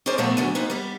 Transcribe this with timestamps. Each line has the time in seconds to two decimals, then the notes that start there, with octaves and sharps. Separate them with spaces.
0.06 C#4 G#4 A#4 C5 D5
0.18 A#2 F3 A3 B3
0.37 D2 D3 F#3
0.55 A#3 D#4 B4 C5
0.70 G3 B3